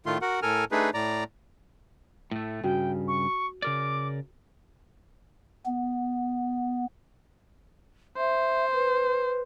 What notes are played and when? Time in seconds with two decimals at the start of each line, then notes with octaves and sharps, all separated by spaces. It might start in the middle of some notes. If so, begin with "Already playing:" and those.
0.06 A2 D#3 A3 F4 C6
0.22 F#4 A#4 F#5
0.42 A2 A4 A#4 G#5 F6
0.72 A3 D4 D#4 G#4 B4
0.94 A2 D5 A#5
2.31 A2 A3
2.64 G2 C#3 F#4 G5
3.08 C#6
3.62 C#3 A#4 D5 D6
5.66 B3
8.17 C5 E5
8.73 B4